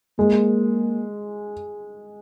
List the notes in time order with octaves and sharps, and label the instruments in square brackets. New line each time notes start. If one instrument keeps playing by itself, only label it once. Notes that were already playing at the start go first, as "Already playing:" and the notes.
[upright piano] G#3 [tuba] A#3